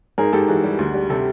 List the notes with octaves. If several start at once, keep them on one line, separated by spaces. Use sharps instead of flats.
G#2 G#4 A#4
G#2 G4 A4
E3 F#4 G#4
G3
D2
G3
C3 G4 A4